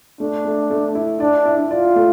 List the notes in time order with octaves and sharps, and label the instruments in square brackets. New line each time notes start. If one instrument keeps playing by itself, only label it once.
[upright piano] A3 [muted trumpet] D4
[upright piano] A3
A3
E4
[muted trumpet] D4 [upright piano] D5
[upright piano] E4
[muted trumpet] F4 [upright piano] D5
[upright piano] A3